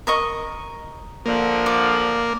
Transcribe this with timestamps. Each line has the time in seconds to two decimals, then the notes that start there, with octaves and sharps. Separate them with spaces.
0.07 A#4 D#5 C#6
1.26 D3 F3 A#3
1.66 D5